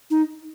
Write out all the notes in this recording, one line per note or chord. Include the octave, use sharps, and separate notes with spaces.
D#4